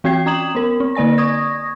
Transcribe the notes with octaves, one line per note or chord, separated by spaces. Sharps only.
E3 C4 F#4 G5 G#6 C7
C#4 A#5 D#6 G#6 E7 F#7
B3 A#4
C4
D3 A#3 D5 G#5 A#6
C#6 D#6 G#6 A#6